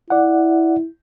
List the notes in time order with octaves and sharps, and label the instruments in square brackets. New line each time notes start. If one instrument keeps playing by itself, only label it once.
[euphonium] E4 [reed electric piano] D5 F#5